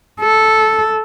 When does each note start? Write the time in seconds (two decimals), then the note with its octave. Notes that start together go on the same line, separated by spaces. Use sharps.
0.21 A4